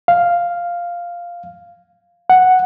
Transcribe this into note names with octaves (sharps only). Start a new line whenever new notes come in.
F5
F#5